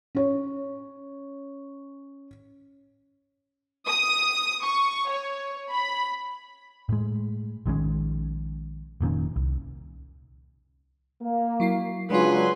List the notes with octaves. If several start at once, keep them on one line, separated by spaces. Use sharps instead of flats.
C#4 C#5
D#6
C#6
C#5
B5
A2 G#3
A#1 D#3 G#3 C#4
F1 A#2 D#3 C#4
C2
A#3
F#3 E4 C7
C#3 F#3 G#3 D4 F4 B4 G#5 C6